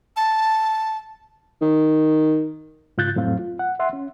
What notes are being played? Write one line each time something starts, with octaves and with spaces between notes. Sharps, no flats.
A5
D#3
G#2 C#3 F4 F#6 G6 A6
F2 A2 F#3 C4 F5
F4
F#5
E5 F#5 C6
C#4